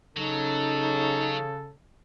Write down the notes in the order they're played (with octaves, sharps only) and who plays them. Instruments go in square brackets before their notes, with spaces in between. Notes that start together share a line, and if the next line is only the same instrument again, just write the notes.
[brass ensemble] C#3 [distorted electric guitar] F#3 [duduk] D#4 [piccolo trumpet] A4